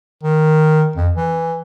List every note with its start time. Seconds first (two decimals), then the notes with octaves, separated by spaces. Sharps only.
0.23 D#3
0.96 F2
1.15 E3